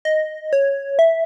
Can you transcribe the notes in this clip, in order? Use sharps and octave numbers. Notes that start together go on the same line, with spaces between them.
D#5
C#5
E5